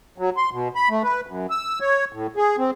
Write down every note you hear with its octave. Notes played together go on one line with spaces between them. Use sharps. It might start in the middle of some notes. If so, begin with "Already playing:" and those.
F#3
C6
B2
B5
A3
B4
F#2
E6
C#5
A2
G#4
C4